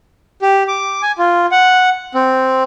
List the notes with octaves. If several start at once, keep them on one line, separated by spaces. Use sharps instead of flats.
G4
D6
G#5
F4
F#5
C4